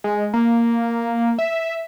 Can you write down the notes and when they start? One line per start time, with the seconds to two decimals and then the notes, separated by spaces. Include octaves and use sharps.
0.04 G#3
0.33 A#3
1.38 E5